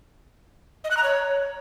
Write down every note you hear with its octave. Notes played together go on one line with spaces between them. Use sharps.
D#5
F#6
A#5
C#5